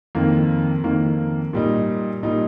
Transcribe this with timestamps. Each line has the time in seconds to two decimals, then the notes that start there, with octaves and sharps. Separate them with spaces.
0.15 F2 D#3 A#3
0.84 F2 D#3 A#3
1.53 A#2 G3 D#4
2.23 A#2 G3 D#4